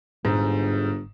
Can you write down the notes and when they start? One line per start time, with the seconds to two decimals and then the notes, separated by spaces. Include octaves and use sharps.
0.25 G1 G#2